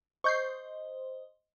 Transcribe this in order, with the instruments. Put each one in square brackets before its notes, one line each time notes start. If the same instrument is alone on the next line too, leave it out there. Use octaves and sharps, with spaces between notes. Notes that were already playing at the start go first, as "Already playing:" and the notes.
[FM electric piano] C5 D#5 [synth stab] C#6 G6 C7